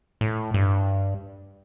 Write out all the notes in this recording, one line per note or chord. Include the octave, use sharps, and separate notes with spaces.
A2
G2